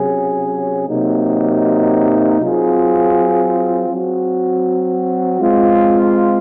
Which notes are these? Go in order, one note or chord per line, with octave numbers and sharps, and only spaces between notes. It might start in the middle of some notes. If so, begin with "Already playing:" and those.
Already playing: C3 F#3 C#4 G#4
C3 F#3 A#3 D#4
F#3 C4 F4 G#4
F#3 C4 F#4
G#3 C4 F4